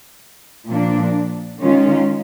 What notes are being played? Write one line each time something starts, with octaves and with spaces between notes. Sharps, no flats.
A#2 F3 A#3 D4
D#3 G#3 C#4 F4